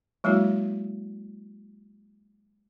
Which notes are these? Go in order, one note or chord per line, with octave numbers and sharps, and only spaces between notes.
F#3 G#3 A#3 E4 F#4